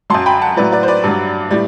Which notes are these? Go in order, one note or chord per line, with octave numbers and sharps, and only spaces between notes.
F#2 F#3 A5 C6
G5 B5
F#5 A5
A2 F#3 B4 D5
B4 D5
C5
B4 D5
G2 F#3
A2 G3